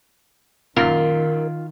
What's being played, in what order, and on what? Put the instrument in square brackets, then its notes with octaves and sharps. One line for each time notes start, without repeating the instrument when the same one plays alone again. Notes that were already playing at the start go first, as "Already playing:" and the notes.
[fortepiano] F#2 A#2 [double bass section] D#3 [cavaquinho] F4 [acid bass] A#4